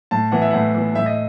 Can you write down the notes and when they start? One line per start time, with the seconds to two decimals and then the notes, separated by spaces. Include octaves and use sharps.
0.11 A2 A5
0.32 E3 B3 F#5
0.42 E5
0.51 A2 F#5
0.75 E3 B3
0.95 A2 E5
1.06 D#5